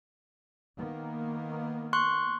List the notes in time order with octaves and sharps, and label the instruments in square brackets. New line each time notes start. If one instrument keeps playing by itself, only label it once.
[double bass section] D#3 A#3 B3
[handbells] C6 C#6 F#6